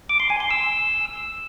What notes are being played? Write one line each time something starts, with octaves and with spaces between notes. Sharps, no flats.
D6
C6
G#5
C6
E6